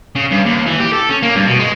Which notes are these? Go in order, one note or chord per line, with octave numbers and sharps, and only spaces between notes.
C#3
G2
D#2
E3
G4
A4
C#4
A#3
G2
B2
G#3